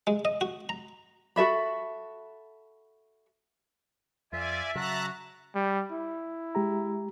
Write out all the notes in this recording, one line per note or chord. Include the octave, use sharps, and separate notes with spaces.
G#3
D#5
F#4
A#5
F#4 A4 E5 B5
F2 F4 D5 E5 G#5
C#3 F#3 F#4 A5 A#5 F#6
G3
E4
G#3 G4 A#5